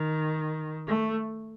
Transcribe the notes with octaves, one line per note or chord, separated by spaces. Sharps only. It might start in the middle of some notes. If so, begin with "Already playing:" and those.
Already playing: D#3
A3